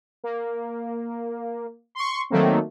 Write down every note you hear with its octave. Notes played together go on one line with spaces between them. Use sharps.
A#3
C6 C#6
D#3 F#3 A3 A#3 C4